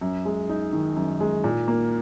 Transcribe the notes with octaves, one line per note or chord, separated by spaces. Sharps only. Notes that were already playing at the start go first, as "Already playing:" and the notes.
F#2
G#3
D#4
D#3
F#2
G#3
A#2
A#3